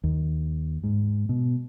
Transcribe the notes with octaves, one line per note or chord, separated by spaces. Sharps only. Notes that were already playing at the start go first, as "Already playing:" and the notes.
D#2
G#2
B2